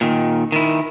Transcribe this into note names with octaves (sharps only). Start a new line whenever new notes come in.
A#2 D#3
D#3 E4